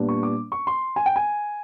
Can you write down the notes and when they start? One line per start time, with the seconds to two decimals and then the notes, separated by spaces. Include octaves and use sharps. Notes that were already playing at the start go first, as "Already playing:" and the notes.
Already playing: A#2 G3 B3 D4
0.09 C#6
0.23 D6
0.52 C#6
0.67 C6
0.96 G#5
1.06 G5
1.16 G#5